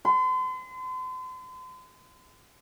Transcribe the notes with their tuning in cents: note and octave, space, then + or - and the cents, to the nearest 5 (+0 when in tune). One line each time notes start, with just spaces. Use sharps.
C6 -40